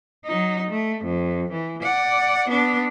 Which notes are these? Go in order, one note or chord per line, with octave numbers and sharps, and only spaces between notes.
F#3 D#4
A3
F2
E3
D5 F#5
B3 D4